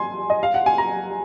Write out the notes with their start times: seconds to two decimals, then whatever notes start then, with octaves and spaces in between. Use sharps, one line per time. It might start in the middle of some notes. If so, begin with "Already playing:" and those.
Already playing: G#5 C6
0.30 D#5
0.43 F5
0.54 F#5
0.66 G#5
0.78 A#5